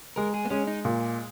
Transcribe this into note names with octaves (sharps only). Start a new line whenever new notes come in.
G#3 A#4
G#4
B3
G#3 C#4
D#4
A#2